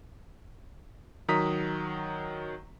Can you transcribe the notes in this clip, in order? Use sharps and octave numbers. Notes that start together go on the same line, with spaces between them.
D#3 F#3 A#5 D#6 B6